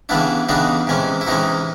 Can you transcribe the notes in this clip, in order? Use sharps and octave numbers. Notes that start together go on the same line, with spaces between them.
C#3 E3 G3 B3 D4 E4
C#3 E3 G3 B3 D4 D#4
C3 E3 G#3 C#4
E4
C3 E3 G#3 C#4 D#4